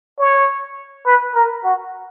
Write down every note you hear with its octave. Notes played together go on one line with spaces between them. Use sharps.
C#5
B4
A#4
F#4